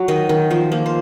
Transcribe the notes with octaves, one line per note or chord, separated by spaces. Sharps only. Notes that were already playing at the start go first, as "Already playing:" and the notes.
Already playing: F#3
D#3 D#5
D#3
F3 C5
A#3
C5